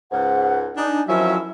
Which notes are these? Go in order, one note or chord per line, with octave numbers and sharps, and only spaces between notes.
C#2 G#2 F#5
D4 D#4 G#5
F2 D#3 F3 F#3 C#4 E4 E5